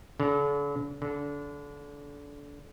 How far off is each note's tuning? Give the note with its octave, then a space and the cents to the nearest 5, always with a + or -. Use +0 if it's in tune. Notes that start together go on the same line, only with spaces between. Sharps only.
D3 -45
D3 -30